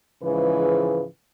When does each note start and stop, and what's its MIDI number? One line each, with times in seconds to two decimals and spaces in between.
0.22 1.05 44
0.22 1.05 49
0.22 1.05 52
0.22 1.05 53
0.22 1.05 56
0.22 1.05 71